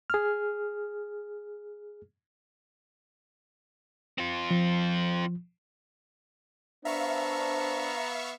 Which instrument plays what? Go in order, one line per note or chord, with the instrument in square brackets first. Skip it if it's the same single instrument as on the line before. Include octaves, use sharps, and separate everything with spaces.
[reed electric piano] G#4 F6
[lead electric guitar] C4 F4
[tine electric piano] F3
[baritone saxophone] B3 [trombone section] D4 C5 [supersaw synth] E5 F5 C#6 [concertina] A#5